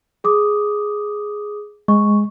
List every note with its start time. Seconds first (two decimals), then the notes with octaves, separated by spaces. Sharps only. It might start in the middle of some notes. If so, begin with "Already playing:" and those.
0.24 G#4 D6 D#6
1.88 G#3 C#6